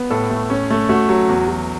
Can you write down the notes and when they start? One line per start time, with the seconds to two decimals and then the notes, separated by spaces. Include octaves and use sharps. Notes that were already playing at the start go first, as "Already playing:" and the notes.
Already playing: B3
0.10 A2 A4
0.30 A3
0.50 C#4
0.70 A3
0.89 A3 F#4
1.09 F#3
1.29 E2
1.48 F#3